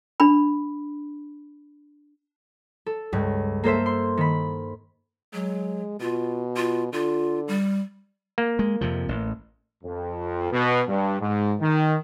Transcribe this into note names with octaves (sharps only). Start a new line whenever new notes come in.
D4 B5
A4
C#2 G2
A#3 A4 C5 E5
C6
D#3 B5
F#3 G#3
B2 F4
F4
D3 F4
G3
A#3
G#3
F2 C3 F3
A1
F2
B2
G2
G#2
D#3